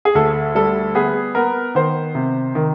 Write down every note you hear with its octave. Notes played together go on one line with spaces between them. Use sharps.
G#4
D2 A4
G3 A4
B3 G#4
B3 A#4
D#3 C5
C3
D#3